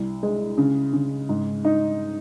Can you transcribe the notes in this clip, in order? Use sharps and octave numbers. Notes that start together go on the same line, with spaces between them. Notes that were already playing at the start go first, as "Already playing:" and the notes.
Already playing: C2
G#3
C#3
C#3
G#2
D#4